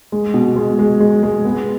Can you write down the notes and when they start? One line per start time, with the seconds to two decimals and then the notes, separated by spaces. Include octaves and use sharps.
0.12 G#3
0.34 B2
0.56 G#3
0.79 G#3
1.00 G#3
1.23 G#3
1.45 B3